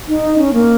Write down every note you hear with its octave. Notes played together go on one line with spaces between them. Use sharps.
D#4
C#4
A#3